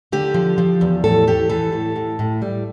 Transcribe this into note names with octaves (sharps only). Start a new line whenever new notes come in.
D3 G4
F3
F3
E2
A2 A4
A2 G4
E3 A4
A2
A2
A2
G3